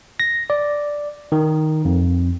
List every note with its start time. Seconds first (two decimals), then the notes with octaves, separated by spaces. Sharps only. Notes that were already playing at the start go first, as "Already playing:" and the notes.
0.20 A#6
0.50 D5
1.32 D#3
1.85 F2